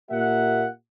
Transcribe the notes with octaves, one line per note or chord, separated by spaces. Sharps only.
A#2 A#3 G4 E5 F#5